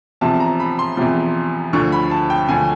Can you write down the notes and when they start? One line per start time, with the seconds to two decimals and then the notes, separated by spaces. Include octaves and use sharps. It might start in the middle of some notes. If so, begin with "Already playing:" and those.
0.21 E2 C3 F3 A5
0.40 A#5
0.60 B5
0.79 C6
0.97 E2 C3 F3
1.73 D2 D3 F3 C#6
1.92 B5
2.11 A5
2.30 G5
2.48 D2 D3 F3 G#5